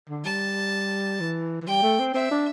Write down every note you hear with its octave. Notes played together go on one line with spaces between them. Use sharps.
D3
G3 A5
E3
E3
G3 G5
A3
C4
C4 E5
D4